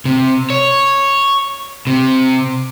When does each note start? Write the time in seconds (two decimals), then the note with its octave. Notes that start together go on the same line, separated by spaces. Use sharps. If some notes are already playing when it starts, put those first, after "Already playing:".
0.05 C3
0.50 C#5
1.87 C3